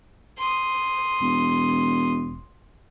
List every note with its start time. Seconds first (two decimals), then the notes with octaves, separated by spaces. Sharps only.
0.38 C6 D#6
1.22 E1